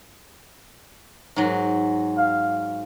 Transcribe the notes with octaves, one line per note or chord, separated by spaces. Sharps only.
G#2 F#3
F5